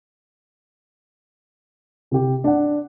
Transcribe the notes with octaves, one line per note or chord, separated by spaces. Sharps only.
C3 G4
D4 F#5